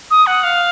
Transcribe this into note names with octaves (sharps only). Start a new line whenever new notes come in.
D#6
F#5
F5